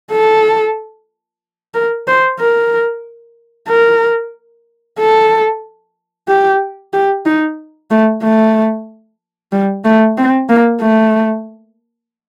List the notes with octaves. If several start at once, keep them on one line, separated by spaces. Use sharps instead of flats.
A4
A#4
C5
A#4
A#4
A4
G4
G4
D#4
A3
A3
G3
A3
C4
A#3
A3